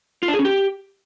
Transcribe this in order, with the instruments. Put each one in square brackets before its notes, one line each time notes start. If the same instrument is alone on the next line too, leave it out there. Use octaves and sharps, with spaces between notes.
[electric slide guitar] F4
D4
G#4
C#4
G4